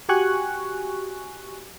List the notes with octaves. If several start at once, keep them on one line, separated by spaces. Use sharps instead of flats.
F#4 G4 G#5 C#6 F#6